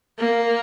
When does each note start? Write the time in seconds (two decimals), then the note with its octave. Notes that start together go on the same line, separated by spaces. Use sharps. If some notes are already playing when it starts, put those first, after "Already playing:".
0.18 A#3